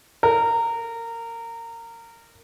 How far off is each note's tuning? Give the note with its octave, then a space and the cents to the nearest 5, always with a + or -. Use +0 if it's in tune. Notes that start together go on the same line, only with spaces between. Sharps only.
A#4 -20